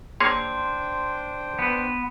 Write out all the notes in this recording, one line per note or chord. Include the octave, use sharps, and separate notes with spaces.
A#3 D4 G#4 C5 C#5 G5 C6
B3 B4